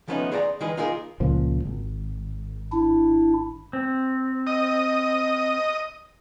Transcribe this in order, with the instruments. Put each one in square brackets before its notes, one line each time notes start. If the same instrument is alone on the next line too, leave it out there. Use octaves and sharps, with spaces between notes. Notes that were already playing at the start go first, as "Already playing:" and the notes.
[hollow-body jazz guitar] D#3 F3 A3 B3 C#4 D#4
G#4 C5 D5 F#5 A#5
D#3 E3 G#3 G#4 B4 D#5
D#4 F4 G#4 A#4
[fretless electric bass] C#2 A#2 F3
G#1
[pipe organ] D4 E4
[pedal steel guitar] C4
[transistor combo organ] D#5